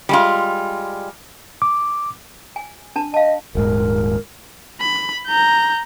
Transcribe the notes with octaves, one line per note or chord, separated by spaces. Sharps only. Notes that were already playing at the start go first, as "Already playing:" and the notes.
G3 G#3 F4
D6
G#5
D4 A5
D#5 F5 A5
D#1 G#2 A#4
B5
A#5 G6